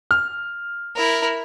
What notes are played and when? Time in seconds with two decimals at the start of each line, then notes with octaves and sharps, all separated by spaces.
0.11 F6
0.96 E4 A#4